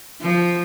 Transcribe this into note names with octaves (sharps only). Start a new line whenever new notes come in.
F3